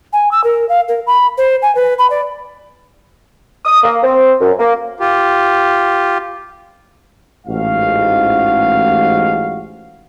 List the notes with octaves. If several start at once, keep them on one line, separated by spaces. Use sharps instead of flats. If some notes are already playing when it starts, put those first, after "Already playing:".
G#5
E6
A#4
F5
A#4
B5
C5
G#5
B4
B5
D5
D#6
A#3
C4
F#2
A#3
F4 G4
A1 G#2 F#4 F5